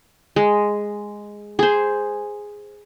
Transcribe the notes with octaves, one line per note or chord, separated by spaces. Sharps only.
G#3
G#4 C5